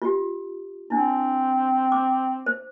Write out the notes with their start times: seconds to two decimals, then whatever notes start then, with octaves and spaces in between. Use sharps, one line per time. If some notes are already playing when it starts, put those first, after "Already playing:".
0.02 F4 G4
0.90 C4 D4 E4
1.92 D6
2.46 C5